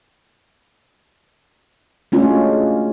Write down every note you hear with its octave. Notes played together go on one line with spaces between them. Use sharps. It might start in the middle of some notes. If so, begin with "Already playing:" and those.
G#3 A3 C#4 D4 F4 F#4